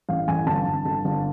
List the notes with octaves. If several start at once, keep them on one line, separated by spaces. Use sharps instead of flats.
A1 F5
A1 G#5
G1 A5
G1
G1
G1